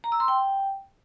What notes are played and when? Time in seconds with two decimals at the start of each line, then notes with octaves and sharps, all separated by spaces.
0.04 A#5
0.12 E6
0.20 C6
0.28 G5